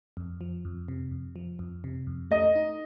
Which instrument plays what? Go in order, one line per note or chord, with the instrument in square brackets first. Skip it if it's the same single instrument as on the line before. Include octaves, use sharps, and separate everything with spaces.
[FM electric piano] F2
F3
F2
C3
F2
F3
F2
C3
F2
[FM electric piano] A3 [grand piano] D#5
[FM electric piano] D#4